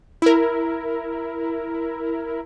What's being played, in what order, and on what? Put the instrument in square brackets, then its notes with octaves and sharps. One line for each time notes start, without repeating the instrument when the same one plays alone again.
[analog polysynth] E4 A#4